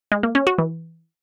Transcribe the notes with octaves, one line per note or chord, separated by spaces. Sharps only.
G#3
A#3
C#4
F#4
E3